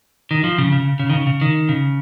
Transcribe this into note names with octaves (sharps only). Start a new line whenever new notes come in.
D#3
F3
C#3
C#3
C#3
D#3
C#3
C#3
D#3
C#3